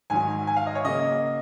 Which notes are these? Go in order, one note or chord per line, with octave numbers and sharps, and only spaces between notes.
G#2 D#3 F#3 G#5
G#5
F5
D#5
C#5
C#3 F#3 A#3 D#5